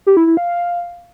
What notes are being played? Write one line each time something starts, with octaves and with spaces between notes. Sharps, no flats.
G4
E4
E4
F5